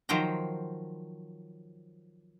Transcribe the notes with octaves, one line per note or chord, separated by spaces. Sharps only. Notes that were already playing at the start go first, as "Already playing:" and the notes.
D#3 F3 F#3 C5 G5 A#5